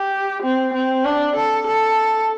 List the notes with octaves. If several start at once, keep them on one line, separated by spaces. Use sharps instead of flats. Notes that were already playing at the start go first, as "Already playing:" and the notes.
Already playing: G4
C4
C4
D4
A4
A4